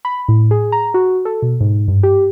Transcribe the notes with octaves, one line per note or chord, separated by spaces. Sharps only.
B5
A2
G#4
A#5
F#4
A4
B2
G#2
G2
G4